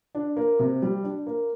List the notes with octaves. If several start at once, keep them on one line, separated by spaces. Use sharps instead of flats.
D4
A#3
C3
G3
D4
A#3